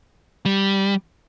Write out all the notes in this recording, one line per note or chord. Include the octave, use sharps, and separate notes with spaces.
G3